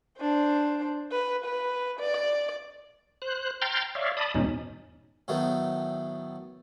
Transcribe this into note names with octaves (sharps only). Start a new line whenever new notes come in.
D4 C5
B4
B4
D5
C5 F#6
G5 A#5 C6 F6 G6 A6
C#5 D5 E5 F5
D5 A5 B5 D#6
E2 G#2 B2 C#4 D#4
A2 D#3 F#3 A3 B3